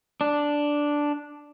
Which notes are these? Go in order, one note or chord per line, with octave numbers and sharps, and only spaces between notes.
D4